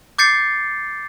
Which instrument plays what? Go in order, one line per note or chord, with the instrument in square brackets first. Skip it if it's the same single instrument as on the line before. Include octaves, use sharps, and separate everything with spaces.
[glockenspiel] D6 G6 A6 C7 C#7